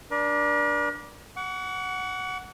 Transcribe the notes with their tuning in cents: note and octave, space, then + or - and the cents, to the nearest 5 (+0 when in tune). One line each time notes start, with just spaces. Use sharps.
D4 +0 A#4 +45
F#5 +0 C#6 +45